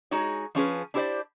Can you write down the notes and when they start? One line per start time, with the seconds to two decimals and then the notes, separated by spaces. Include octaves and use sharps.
0.11 G#3 D#4 F#4 G#4 C#5
0.55 F3 C#4 G#4 B4
0.94 D4 E4 G4 A4 C5 D5